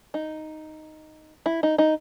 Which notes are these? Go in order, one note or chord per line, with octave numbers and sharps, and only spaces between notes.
D#4
E4
D#4
D#4